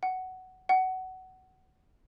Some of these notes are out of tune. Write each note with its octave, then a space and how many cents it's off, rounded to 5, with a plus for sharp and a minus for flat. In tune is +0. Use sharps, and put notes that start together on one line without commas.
F#5 +10
F#5 +20